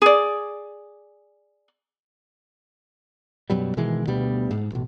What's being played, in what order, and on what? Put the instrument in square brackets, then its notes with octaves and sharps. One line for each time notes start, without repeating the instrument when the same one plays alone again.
[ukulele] G#4 D5
[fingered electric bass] F#2 B2 F#3 G3
B2 D#3 E3 G#3
D2 B2 G3 B3
G#2
A1 B2